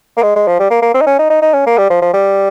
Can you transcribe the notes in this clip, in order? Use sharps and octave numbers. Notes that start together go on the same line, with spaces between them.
A#3
G#3
G#3
F3
G3
A#3
A#3
C4
D#4
C#4
D#4
D#4
D#4
C#4
A#3
G3
F3
F3
G3